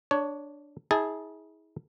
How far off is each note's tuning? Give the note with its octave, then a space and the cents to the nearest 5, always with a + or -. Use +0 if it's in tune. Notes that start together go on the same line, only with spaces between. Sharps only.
D4 +0 C#5 +15
E4 -45 G#4 +0 A5 +0